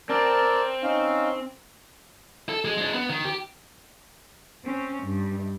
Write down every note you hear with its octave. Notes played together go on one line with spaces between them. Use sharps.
C4 A#4 D5 A5
C#4 D#4 F5
A4
G#3
G#3 D4
B3
D#3
G4
C4 C#4
G2